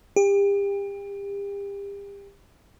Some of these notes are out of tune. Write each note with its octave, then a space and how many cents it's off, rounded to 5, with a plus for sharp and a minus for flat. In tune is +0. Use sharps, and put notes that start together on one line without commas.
G4 +35